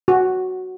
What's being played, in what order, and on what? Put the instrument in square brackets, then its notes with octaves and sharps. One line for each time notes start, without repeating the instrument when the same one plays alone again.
[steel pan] F#4